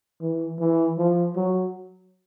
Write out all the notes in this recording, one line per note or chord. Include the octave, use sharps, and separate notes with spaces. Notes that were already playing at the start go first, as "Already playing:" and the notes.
E3
E3
F3
F#3